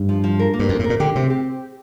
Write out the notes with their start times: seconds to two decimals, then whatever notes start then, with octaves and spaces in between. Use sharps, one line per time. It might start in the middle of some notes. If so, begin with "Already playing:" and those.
Already playing: G2
0.09 F3
0.24 F3
0.39 A#4
0.54 A#3
0.59 G2
0.69 F2 A#3
0.79 A2
0.84 A#4
0.90 A#2
1.00 D3 G4
1.15 C3 C4
1.30 G4